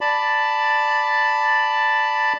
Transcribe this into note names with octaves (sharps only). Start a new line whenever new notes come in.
D5 A5 B5